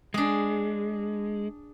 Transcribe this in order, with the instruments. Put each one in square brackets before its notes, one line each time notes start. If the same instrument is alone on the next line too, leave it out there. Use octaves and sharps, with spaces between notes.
[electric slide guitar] G#3 [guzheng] D4 G#4